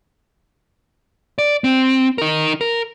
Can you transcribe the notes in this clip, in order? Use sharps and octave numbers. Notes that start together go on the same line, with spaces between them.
D5
C4
D#4 A#4
A#4